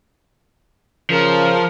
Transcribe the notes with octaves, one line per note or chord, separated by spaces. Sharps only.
C#3 F3 A#4